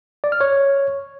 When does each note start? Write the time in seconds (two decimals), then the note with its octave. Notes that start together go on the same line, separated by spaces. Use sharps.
0.24 D5
0.32 F6
0.41 C#5